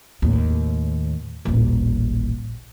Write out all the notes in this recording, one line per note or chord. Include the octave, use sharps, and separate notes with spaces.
D#2 A2
D#1 A1